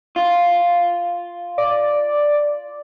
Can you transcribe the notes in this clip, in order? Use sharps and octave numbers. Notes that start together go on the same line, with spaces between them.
F4
D5